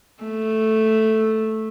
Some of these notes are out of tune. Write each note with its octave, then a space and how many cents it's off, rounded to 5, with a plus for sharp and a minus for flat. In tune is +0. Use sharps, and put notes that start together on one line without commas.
A3 +0